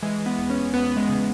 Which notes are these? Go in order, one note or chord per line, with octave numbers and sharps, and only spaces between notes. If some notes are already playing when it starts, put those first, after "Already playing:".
E3 G#3
B3
E2
C#4
E2 B3
G#3
C#3